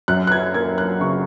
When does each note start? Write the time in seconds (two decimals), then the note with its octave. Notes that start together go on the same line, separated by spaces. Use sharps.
0.08 F#2 F#6
0.27 F#6
0.32 G#6
0.54 A#3 G#6
0.78 F#6
1.01 C#3 C#6